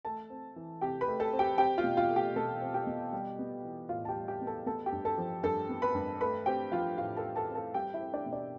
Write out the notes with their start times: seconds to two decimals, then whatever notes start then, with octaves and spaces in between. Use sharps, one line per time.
0.05 A3 A4 A5
0.30 C4
0.56 E3
0.81 C3 G4 G5
1.01 B4 B5
1.08 A3
1.20 A4 A5
1.33 C4
1.39 G4 G5
1.58 C4 G4 G5
1.78 F4 F5
1.84 B2
1.97 F4 F5
2.10 A3
2.16 G4 G5
2.36 B2 A4 A5
2.61 C4
2.74 G4 G5
2.87 B2
3.13 G3
3.39 B3
3.65 E3
3.89 A2 F4 F5
4.05 A5
4.09 G4 G5
4.16 G3
4.28 G4 G5
4.41 B3
4.47 A4 A5
4.66 B3 A4 A5
4.86 G4 G5
4.92 G2
5.05 A4 A5
5.18 F3
5.43 G2 A4 A5
5.69 B3
5.82 B4 B5
5.95 G2
6.21 A3 B4 B5
6.46 C4 G4 G5
6.72 F3 F4 F5
6.98 A2 F4 F5
7.17 A4 A5
7.23 A3
7.36 A4 A5
7.50 C4
7.55 A4 A5
7.74 G3 G4 G5
7.94 E4 E5
8.00 C4
8.14 D4 D5
8.26 B2
8.33 D4 D5